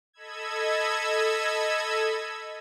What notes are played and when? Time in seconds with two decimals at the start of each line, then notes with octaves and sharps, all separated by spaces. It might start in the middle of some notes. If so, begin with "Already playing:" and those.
0.13 A4 D#5 B5 E6 G#6